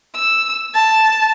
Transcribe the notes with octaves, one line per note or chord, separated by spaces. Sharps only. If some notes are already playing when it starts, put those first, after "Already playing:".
E6
A5